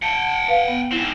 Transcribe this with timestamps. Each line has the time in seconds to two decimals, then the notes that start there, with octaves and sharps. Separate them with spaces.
0.03 F#5 G5 A5
0.48 B4 F5
0.68 B3
0.91 G#2 C4 E4